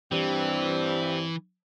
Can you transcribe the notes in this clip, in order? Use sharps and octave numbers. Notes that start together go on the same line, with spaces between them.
G2 E3 G3 C4